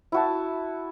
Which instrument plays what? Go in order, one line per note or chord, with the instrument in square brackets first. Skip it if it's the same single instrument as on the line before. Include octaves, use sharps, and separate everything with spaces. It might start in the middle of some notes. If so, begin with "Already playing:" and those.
[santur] E4 F#4 A5